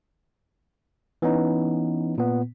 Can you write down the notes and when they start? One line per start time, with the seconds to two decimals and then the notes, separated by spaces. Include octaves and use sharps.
1.22 E3 B3 C#4 D#4
2.18 A#2 B3